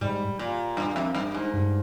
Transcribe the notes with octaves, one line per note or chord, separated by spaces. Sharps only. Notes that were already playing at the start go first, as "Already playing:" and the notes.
G#2 G3
A#2
G2
F2
G2
G#2
G2